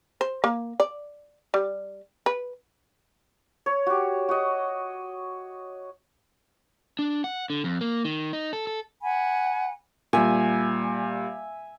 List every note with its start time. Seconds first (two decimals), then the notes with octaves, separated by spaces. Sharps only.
0.21 C5
0.44 A#3
0.80 D5
1.54 G3
2.26 B4
3.66 C#5
3.86 F#4 G4
4.29 F#4 D#5
6.99 D4
7.24 F#5
7.50 D3
7.64 F2
7.81 A#3
8.05 D#3
8.33 D#4
8.53 A4
8.67 A4
9.02 F#5 G#5 B5
10.13 A#2 G3 E5 G#5